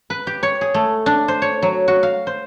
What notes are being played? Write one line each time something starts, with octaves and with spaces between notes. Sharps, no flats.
B4
G4
C#5
G#4
A3
D4
C5
C#5
F#3
F#4
F5
C5